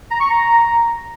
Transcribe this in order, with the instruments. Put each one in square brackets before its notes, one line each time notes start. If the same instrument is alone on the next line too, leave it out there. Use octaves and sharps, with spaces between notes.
[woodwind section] A#5
C#6
A#5